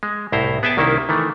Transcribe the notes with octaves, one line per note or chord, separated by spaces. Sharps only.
G#3
C2 A2 E4 C5 A#5
B3 G#4 E5 G5 A5
C2 D#3 A#3 C#4 E4
D#3 E3 A3